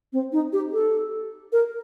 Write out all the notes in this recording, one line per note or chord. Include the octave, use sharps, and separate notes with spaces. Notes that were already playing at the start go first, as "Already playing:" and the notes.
C4
D#4
G4
A4
A#4